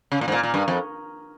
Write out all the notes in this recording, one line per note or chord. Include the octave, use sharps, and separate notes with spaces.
C#3
A#2
G#2
A#2
A#2
G2
F2